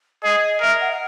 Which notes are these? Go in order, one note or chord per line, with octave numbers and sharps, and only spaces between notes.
G#4 D#5
A#4 E5
F#5